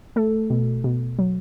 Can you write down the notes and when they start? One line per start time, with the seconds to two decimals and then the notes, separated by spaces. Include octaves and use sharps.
0.16 A3 A4
0.50 B2
0.84 B2
1.19 F#3